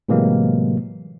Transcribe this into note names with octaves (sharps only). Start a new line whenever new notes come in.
A2 C3 E3 F#3 G#3 A#3